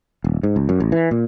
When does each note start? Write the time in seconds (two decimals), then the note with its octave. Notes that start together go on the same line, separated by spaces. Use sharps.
0.24 D#1
0.43 G#2
0.56 C#2
0.69 F#2
0.80 A1
0.92 E3
1.11 A#2